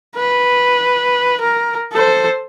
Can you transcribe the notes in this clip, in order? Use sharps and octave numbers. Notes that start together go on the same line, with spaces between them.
B4
A#4
A4 C5